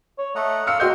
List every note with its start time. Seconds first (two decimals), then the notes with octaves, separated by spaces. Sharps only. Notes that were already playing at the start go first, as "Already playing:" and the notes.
0.18 C#5
0.35 A3 D#5 F#5 A#5
0.67 A4 F5 C6 E6 F6 C#7
0.80 C4 F#4 A#4 D#5 F6 G6